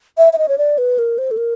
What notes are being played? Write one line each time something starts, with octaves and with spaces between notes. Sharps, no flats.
E5
E5
D#5
C#5
D5
B4
A#4
C5
A4
A#4